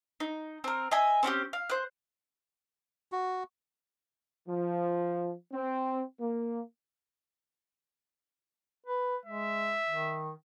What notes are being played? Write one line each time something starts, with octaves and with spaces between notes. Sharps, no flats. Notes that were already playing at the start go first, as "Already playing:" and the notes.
D#4
C4 A#4
D#5 E5 G#5
C4 C#4 F#4 G4
F5
C5 F#6
F#4
F3
C4
A#3
B4
G#3 E5
D#3